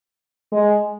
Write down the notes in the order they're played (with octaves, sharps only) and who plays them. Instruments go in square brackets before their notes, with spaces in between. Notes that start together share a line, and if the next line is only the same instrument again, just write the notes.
[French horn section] G#3